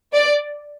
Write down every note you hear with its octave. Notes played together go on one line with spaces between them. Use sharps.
D5